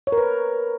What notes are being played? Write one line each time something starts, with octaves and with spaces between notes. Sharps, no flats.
C#5
A#4
B4